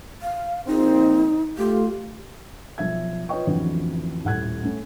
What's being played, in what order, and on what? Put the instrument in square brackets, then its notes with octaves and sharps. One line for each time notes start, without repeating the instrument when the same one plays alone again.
[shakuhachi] F5
[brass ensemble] A#1 C4 [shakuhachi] D#4
[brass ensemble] A3 F4 [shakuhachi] G4
[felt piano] B1 F3 E5 G#6
F4 B4 C#5 D#5 G5 C#6
A1 F2 D3 E3 F#3
D#1 A2 F#5 F#6 G#6
A3 C#4